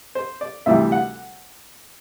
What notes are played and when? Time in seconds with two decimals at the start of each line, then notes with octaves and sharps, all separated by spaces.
0.15 C5
0.41 D5
0.66 D2 C3 E3 G3 E5
0.92 F#5